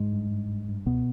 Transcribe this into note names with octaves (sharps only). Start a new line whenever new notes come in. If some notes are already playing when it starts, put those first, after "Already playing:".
Already playing: G#2 G#3
G2
G2
G2
G2
C#2 B2 B3